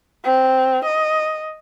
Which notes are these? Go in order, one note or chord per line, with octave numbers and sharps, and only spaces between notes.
C4
D#5